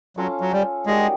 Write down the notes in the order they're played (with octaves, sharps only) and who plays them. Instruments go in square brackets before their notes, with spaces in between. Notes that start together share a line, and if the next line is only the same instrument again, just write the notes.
[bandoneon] F#3 [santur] C#4 F4 A4
[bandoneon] F#3
G3
[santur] G3 A#3 D#4 F#4 [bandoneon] G#3